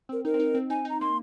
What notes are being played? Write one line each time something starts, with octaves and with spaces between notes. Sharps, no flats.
C4 A#4
D#4 A#4
C4
D#4
C4
D#4 G#5
D#4 A#5
A#3 C6